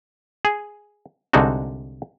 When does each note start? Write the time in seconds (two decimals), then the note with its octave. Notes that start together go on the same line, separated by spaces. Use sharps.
0.45 G#4
1.33 C2 D3 G#3 D#4 F#4